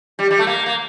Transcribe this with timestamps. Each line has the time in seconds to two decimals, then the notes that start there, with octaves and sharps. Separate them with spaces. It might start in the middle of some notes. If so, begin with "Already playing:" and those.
0.19 G3
0.31 G3
0.39 A3
0.47 A#3
0.66 A#3